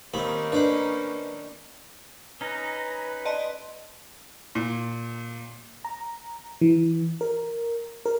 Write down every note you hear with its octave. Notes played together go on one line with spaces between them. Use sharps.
D#2 D#3 A#3 C4 C#4 D#4 B5
D4 B4 C5 B5
C#4 D#4 B4 A#5
D5 D#5 A5 C6
A#2
A#5
E3
A#4
A#4